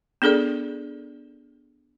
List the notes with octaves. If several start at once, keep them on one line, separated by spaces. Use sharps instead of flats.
B3 D4 G#4 A4 D5